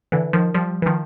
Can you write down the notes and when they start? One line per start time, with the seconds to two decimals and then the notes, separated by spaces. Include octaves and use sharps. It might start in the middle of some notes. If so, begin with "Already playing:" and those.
0.12 D3 E3
0.33 D#3 F3
0.54 F3 G3
0.82 E3
0.86 D#3 F3